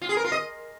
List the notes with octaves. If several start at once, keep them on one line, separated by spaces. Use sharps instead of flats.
F4
G#4
A#4
F4
D#5